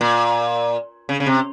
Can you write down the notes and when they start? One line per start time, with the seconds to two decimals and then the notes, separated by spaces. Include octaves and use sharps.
0.01 A#2
1.09 C#3
1.20 C#3
1.26 C3